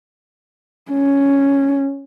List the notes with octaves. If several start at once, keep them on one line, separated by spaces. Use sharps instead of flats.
C#4